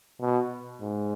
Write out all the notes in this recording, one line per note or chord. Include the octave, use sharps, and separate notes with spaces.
B2
G#2